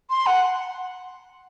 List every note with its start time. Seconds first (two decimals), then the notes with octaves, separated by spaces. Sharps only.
0.10 C6
0.26 F#5